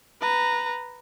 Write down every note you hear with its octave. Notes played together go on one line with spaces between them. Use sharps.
B4 A#5